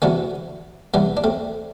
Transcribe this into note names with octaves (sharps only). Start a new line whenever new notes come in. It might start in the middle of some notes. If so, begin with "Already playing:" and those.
D2 C3 E3 B3 D4
C2 C3 E3 B3 D4
D4
A3 C4